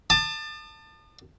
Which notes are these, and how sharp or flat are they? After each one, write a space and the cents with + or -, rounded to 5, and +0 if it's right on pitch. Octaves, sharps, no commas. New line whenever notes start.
A5 +20 D#6 -40